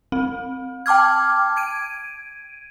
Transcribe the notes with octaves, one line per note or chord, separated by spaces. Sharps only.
C4
G5 A5 D6 F6 G#6
G#6 D7 D#7